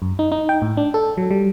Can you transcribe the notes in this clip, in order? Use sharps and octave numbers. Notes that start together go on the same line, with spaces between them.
F#2
D#4
D#4
G5
A2
D4
A4
F#3
G3